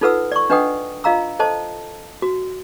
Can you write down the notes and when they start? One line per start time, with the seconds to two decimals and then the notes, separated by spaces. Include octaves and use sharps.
0.01 D#4 F4 A4 B4 F#5 E6
0.32 D5 C#6
0.50 D4 B4 D#5 F#5 G5 D#6
1.04 F4 D#5 F5 A#5 E6
1.39 A4 C5 D#5 A5
2.22 F#4